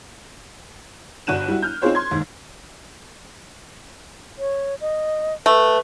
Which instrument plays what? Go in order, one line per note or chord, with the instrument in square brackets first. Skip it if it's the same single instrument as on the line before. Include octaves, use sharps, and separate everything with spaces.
[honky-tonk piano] G1 D4 F#4 F#6 D#7 E7
G3 E4 F#4
F6 G6
C4 D#4 F4 G#4 C5 C#5
C6 G#6
D#2 G#2
[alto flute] C#5
D#5
[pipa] A3 [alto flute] B4